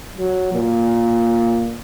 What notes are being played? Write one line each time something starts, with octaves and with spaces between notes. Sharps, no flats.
F#3
A#2